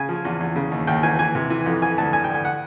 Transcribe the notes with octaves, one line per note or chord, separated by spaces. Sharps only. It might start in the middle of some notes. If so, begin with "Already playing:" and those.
Already playing: C#3 G#5
F3
E2
E2
C#3
D#2
D#2 G5
E3 G#5
E3 G#5
C3
E3
F2
E3 G#5
D2 A5
D2 G#5
G5
D2 G#5
F#5